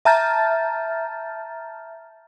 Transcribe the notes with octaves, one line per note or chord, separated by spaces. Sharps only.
E5 A5 A#5 F6 G6 A6